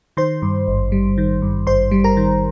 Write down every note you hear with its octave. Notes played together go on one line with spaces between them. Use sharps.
D#3 C5 C6
G2
G#1
G3
D#3
G2
G#1 C5 C6
G3
A#4 A#5
D#3